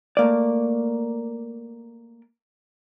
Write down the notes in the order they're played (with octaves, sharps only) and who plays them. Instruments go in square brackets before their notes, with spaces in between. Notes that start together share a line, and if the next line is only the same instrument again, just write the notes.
[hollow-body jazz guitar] A3 A#3 D5